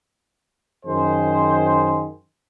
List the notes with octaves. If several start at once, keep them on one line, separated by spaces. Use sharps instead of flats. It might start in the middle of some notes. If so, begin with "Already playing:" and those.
F#2 D#3 G#4 C5